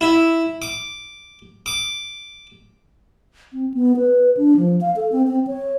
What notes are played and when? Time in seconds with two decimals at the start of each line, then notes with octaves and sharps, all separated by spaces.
0.01 E4
0.62 D6
1.66 D6
3.53 C4
3.74 B3
3.97 B4
4.37 D4
4.57 F3
4.81 F5
4.96 A4
5.12 C4
5.27 C4
5.47 C#5